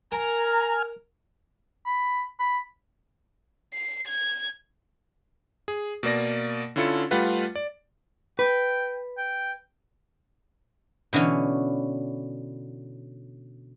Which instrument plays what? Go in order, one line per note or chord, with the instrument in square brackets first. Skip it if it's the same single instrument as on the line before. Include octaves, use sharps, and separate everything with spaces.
[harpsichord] A#4 [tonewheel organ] G#5 F6 [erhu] A#5
[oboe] B5
B5
[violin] C7
G#6
[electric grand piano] G#4
B2 A#3 D5 A#6
D3 C#4 E4 F4 A4 C#7
G3 A3 F4 B4 F#5 G5
D5
[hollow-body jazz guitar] B4 [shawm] G5
[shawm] G5
[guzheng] B2 D3 E3 C#4